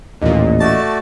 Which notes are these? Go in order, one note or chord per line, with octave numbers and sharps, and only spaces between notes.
A1 D#2 A#2 D#5
A3 F#4 D5 A5 A6